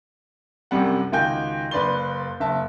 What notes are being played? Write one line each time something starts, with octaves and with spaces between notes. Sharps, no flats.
C2 F#2 C3 G3 F#5
C#2 D#3 F#4 G5 G#5 G6
F#1 B4 D5 C6 G7
F#1 E5 A5